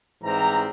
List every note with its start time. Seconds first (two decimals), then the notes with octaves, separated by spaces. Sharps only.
0.23 G#2 E3 G3 C4 A#5